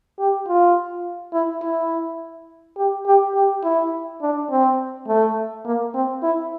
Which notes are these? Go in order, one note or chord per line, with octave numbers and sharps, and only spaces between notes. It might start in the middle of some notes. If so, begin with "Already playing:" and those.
G4
F4
E4
E4
G4
G4
G4
E4
D4
C4
A3
A#3
C4
E4